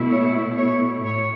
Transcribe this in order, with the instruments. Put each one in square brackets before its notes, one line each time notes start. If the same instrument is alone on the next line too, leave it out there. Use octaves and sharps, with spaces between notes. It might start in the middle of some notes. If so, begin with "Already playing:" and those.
Already playing: [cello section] B2 A3 E4
C#5
C#5
A2 C#5